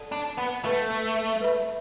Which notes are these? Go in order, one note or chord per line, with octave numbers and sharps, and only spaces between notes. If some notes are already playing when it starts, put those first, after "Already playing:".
Already playing: A4 D5 F#5 A5
D4
B3
A3 B4 F#5 A5
B4 E5 B5